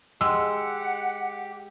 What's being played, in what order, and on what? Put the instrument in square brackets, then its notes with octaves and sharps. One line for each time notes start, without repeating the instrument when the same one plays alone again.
[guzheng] G#3 [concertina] G4 [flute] F#5 [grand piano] E6